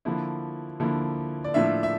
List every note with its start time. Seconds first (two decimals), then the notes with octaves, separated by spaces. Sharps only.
0.05 D3 F3 A#3 E4
0.80 D3 F3 A#3 E4
1.44 D5
1.54 A2 F3 A#3 D4 F4 E5
1.83 E5